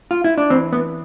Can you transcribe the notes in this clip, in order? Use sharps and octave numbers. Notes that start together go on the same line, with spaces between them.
F4
E4
D4
E3 C4
B3